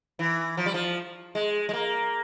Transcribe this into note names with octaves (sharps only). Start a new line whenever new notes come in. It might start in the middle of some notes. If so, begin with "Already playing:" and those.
E3
F3
G3
F3
G#3
G#3
A#3